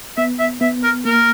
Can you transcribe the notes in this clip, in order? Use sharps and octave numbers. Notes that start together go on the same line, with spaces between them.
B3 E5
E5
B3 E5
A#4
A#3 A#4